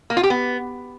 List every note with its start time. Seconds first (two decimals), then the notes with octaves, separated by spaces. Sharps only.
0.10 A#3
0.17 F4
0.23 G4
0.30 B3